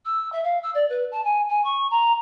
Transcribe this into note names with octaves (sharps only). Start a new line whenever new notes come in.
E6
E5
F5
E6
D5
B4
A5
G#5
G#5
C#6
A#5